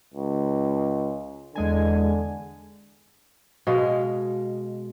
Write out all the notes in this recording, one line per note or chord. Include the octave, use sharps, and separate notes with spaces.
C#2
E2 D3 G#3 G#5
B2 G#3 F5